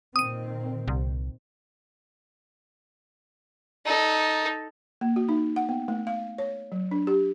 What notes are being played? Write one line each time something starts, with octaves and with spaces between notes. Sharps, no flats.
A#2 D#3 C4 D#6 D#7
C2
D#4 A4
A#3
F#4
D#4
F#5
B3
A3
F5
C#5
F#3
D4
G4